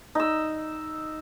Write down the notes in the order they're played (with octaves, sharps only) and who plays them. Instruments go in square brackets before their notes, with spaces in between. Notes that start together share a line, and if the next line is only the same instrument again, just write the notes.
[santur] D#4 E6